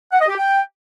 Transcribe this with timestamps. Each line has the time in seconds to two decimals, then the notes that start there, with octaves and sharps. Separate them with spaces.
0.12 F#5
0.20 D#5
0.29 G4
0.37 G5